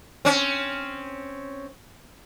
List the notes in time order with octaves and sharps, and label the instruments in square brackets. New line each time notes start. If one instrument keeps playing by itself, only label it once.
[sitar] C4 C#4